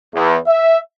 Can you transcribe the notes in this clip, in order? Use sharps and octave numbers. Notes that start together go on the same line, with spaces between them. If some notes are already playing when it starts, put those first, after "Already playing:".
E2
E5